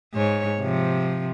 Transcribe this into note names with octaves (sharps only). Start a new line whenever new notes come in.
G#2 C#5
C3 F3